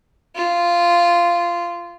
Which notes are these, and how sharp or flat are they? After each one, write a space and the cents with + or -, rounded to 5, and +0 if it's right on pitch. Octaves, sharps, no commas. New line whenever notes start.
F4 -10